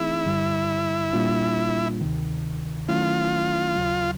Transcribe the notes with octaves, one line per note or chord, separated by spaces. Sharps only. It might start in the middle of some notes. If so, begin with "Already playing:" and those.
Already playing: E3 A3 C4 D#4 E4 G#4
G2 D3 G3
A#2 G3 A#3 D4 F4
D2 C3 D#3
D#3 F#3 A3 C#4 E4 F4
D#2 C#3 F#3